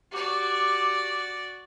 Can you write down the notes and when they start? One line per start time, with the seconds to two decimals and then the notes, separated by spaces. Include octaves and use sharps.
0.12 F#4 G4 D5